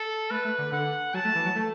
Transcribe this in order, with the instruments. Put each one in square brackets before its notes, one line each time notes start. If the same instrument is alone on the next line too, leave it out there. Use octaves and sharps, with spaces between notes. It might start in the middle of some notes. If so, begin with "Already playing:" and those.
Already playing: [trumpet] A4
[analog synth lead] A3 [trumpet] B4
[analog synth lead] A3
D3
[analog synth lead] D3 [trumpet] F#5
[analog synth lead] F#3 [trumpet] A5
[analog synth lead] A3
E3
F#3
A3